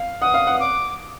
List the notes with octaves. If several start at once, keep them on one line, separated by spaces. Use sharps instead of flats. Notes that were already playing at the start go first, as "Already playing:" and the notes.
Already playing: F5
F#5 D#6
F5
F#5
D6